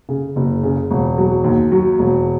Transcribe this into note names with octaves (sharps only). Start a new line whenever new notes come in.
C#3
F#1
C#3
E1
F#3
D#2
F#3
E1